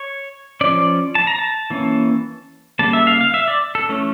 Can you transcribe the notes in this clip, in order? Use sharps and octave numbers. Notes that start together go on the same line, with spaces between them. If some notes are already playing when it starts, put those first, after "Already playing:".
Already playing: C#5
F3 C#4 D5
A5
A#5
A5
E3 A#3 C#4
C#3 G3 A#3 A5
E5
F5
F5
E5
D5
A4
E3 A3 C#4